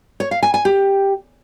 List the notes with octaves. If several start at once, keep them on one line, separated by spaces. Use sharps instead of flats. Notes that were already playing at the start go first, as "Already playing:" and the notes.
C#5
F5
G#5
G#5
G4